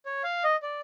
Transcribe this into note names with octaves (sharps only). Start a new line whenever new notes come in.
C#5
F5
D#5
D5